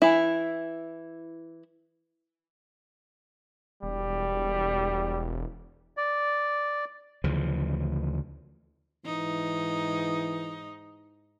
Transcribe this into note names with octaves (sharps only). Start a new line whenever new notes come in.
E3 E4
E1 G3
D5
D2 C#3 E3 F3
G#2 E3 D#4